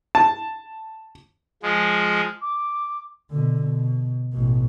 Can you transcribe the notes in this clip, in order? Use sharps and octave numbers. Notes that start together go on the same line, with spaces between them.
A5
F3 G#3
D6
B2 D3
B2
A1 B2